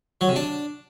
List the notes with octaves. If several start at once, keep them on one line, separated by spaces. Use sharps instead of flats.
F#3
C3
D4